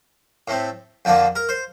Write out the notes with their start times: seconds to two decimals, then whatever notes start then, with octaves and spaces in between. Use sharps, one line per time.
0.48 A2 A3 C4
1.05 F2 D3 F3 A#3 D4
1.36 A#4
1.49 C5